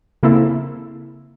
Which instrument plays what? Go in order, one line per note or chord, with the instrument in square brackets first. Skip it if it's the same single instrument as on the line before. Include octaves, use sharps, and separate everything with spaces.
[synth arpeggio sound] C#3 A#3 C4 E4 A4